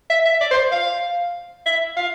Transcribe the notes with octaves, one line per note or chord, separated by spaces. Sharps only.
E5
E5
D5
C5
F5
E5
F5